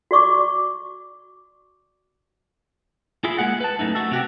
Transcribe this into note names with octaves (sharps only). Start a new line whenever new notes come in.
F#4 D5 C#6 D6
E4 F4 G#4
G#3 A#3 G#4 F#5
B4 A5
F#2 F#3 A3 D#4 E4
A3 F#4 A4
C3 F#4 G4